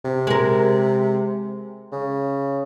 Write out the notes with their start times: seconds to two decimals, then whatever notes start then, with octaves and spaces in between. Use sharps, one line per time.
0.05 C3
0.27 G#3 A#4
1.92 C#3